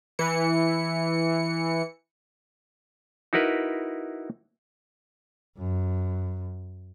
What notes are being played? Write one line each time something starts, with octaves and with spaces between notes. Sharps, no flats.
E3 C#7
D#4 E4 F#4 A#4 B4
F#2